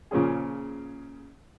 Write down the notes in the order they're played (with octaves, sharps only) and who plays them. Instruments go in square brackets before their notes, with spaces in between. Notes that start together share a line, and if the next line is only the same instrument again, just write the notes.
[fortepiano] A#2 C#3 F3 C#4 G#4